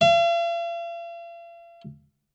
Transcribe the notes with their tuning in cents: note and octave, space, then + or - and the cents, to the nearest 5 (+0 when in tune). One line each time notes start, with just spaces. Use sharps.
F5 -45